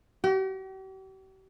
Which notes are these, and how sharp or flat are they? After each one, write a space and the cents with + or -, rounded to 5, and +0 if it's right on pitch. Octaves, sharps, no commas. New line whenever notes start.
G4 -45